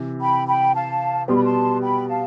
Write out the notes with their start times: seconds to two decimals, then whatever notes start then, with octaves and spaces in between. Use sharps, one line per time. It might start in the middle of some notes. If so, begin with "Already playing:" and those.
Already playing: C3 E3
0.20 G5 B5
0.47 G5 B5
0.74 F5 A5
1.28 B2 G3 B3 C6
1.35 B5
1.43 A5 C6
1.81 G5 B5
2.08 F5 A5